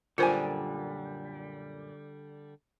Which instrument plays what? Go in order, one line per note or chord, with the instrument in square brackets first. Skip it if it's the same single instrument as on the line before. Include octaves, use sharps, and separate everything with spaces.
[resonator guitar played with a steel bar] F#2 A#2 G#5 [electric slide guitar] D3 G3 [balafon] F4 A#4 C5